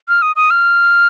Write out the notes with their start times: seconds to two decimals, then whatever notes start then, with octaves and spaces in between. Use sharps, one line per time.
0.09 F6
0.22 D#6
0.36 D#6
0.50 F6